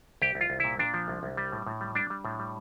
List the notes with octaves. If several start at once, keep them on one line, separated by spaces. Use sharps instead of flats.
C2 G4
C2
F4
C2
A#2 E4
A#2 D4
F3
C2
C2
G3
A2
A2
G3
G3 D4
G3
A2
G3